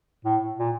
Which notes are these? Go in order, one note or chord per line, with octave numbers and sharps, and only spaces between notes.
A2
A#2